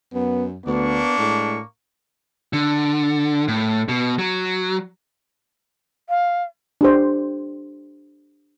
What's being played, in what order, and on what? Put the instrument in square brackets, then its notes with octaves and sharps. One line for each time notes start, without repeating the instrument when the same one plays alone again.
[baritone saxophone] F#2 [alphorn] B3
[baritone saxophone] D2 [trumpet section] A#3 D4 C#6 [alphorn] B3
[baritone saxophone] A2 [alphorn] G#3
[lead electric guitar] D3
A2
B2
F#3
[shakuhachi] F5
[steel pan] D4 G4 C5